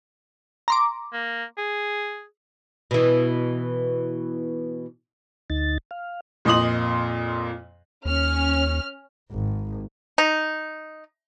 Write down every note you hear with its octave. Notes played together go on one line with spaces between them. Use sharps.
A#5 C6 D6
A#3
G#4
B2 E3
D2 D#4 A6
F5
F2 A#2 D#5 C6 D#6 F#7
D#2 C#4 F6
G#1
D#4